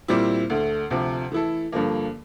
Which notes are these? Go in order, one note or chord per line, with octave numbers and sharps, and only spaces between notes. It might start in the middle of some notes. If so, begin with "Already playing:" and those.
A#2 G3 C4 E4
D2 D3 A3
D2 C3 F3
E3 A3 E4 A4
G2 D3 F3 A#3